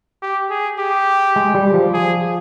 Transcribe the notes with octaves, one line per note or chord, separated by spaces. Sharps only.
G4
G#4
G4
G#3
G3
F3
G#4